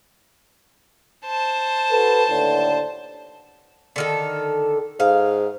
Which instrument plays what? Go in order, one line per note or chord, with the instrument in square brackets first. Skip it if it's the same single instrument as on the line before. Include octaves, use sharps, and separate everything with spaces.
[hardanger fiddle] C5 A5
[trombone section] F#4 A4 B4
D#2 A2 D3
[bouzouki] D3 D#3 A4
[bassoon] G#2 [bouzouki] F5